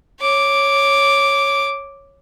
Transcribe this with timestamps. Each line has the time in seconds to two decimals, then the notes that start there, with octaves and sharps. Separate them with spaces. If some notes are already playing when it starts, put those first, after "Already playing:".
0.21 C#5 D6